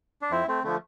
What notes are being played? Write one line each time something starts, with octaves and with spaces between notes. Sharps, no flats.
D4
F2 C4 E4
A3 C4
D3 F3 A3